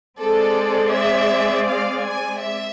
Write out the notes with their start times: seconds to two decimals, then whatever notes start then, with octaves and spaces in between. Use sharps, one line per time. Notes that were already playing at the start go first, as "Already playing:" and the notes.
0.20 G#3 C4 G#4 A4 D5
0.94 E5
1.68 F5
2.05 G#5
2.40 E5